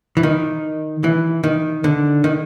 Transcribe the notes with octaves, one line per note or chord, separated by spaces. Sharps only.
E3
D#3
E3
D#3
D3
D#3